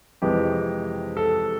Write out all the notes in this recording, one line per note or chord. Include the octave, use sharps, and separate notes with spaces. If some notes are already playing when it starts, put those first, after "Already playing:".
F2 C3 E3 G#3 G4
A4